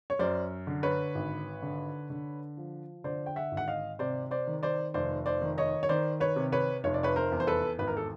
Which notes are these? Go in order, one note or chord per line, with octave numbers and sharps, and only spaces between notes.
C#5
F#2 C5 D5
D3
B4 C#5
G#1
D3
D3
F3
D3 C5 D5
G5
E5 F#5
G#1
F#5
D#5 F5
C3 C5 D5
C5 D5
D#3
C5 D5
F1 C5 D5
C5 D5
D#3
C#5 D#5
C#5
D#3 C5 D5
B4 C#5
C3
B4 C#5
F1 C#5
D5
B4 C#5
A#4 C5
E2
C5
A4 B4
G#1 B4
A#4
A4